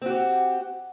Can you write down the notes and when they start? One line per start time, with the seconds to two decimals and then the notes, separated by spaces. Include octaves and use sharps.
0.01 C4
0.06 F#4
0.10 G4